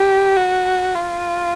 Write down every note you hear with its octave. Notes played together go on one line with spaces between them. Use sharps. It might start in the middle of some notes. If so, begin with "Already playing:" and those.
Already playing: G4
F#4
F4